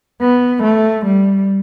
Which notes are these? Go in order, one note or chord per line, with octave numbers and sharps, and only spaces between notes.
B3
A3
G3